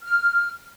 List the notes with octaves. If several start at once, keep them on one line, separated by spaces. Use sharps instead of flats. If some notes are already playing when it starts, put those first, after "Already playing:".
F6